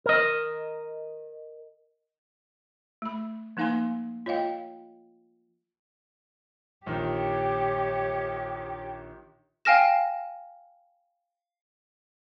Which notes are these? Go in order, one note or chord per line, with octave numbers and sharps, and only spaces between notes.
A#4 D#5
A3 B5
F3 A#3 D#4 F5 G#5 C6
F4 C#5 D#5 F5 G5
A#1 D#3 G4 C#5
F5 G5 G#5 F6 A#6 E7